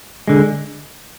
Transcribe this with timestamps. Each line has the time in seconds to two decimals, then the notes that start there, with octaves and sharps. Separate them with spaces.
0.28 D3 G#3